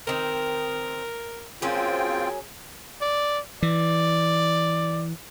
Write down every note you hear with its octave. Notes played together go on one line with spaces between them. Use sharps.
D#3 C4 A#4
F#3 A#3 C4 C#4 F4 G#4 G5
D5
E3 D5